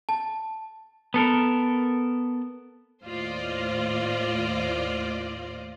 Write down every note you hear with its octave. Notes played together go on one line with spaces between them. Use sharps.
A5
B3 A4 A#4
D#2 A2 F4 C5 D5 D#5